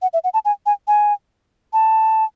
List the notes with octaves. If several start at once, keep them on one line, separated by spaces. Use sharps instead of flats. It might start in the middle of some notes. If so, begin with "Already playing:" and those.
F#5
E5
F#5
A5
G#5
G#5
G#5
A5